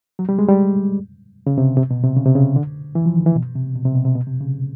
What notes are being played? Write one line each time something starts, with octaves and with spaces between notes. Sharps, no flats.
F#3
G3
G#3
G3
C#3
C3
C3
B2
C3
C#3
C3
C#3
D3
E3
F3
D#3
E3
B2
C3
B2
C3
B2
C3
B2
C3
C#3